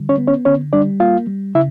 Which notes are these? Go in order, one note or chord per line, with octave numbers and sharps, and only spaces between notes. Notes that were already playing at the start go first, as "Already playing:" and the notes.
Already playing: D3 G3
C#4 C#5
B3
C#4 C#5
D3 C#4 C#5
G3 D4 D5
A#3 F4 F5
G3
C#3 E4 E5